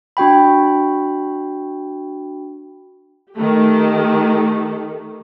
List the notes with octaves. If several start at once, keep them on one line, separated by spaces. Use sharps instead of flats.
D4 F#4 G5 B5
D#3 A3 G4